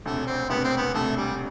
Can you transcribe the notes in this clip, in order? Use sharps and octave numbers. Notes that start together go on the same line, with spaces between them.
E1 D2 C3 A3
C4
E1 D2 C3 B3
C4
B3
E1 D2 C3 A3
G3